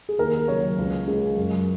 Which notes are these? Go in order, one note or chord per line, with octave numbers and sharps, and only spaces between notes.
G#4
D#2 A#4
C#3 F#3 A#3 C#5
C#2
C#3 G#3
F#2